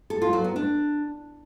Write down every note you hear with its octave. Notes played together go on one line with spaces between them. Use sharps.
A4
F4
F#3
B3
D4